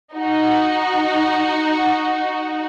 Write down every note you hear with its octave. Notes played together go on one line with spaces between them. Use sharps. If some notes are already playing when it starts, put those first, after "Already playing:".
D#4 F#4